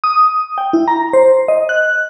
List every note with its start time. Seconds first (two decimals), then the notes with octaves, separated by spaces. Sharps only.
0.04 D#6
0.58 G5
0.73 E4
0.88 A#5
1.13 C5
1.48 D#5
1.69 F#6